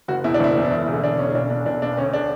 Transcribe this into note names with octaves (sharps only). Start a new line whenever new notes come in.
F#1 F#4
E2 B2 E4
D4
F#1 E4
E2 B2
E1
E2 D3
E1 D4
E2 D3 C#4
B1 D4
B2 D4
B1 D4
B2 D4
D2 C#4
D3 D4